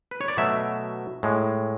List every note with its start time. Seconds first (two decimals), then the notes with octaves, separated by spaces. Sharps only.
0.11 B4
0.21 C#5
0.28 D5
0.37 B2 F#3 A3 E5
1.23 A2 G#3